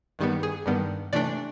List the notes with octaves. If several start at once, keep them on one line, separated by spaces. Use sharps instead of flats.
G2 D#3 G3 B3
G#4
G2 D#3 G3 B3
C3 E3 A3 D4 D5